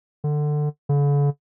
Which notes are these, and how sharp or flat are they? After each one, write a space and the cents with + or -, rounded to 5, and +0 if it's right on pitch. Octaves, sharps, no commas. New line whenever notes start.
D3 +20
D3 -45